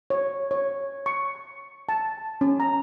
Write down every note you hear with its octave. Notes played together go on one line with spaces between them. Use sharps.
C#5
C#5
C#6
A5
C#4
A#5